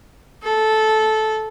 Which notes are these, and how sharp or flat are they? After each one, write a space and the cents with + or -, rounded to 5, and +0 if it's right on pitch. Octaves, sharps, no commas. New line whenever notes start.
A4 -15